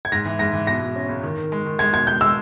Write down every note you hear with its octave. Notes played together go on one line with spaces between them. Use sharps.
G#6
G#2 A#6
E3
G#2 A#6
E3
B2 A#6
B2
C#4
C#2
D#3
D#3
G#3
D#3
G#3 G#6
B2 G#6
G#3 G6
G#3 E6